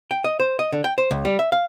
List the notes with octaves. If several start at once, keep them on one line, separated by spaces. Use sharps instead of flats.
G5
D#5
C5
D#5
D3
G5
C5
C#2
G3
E5
F5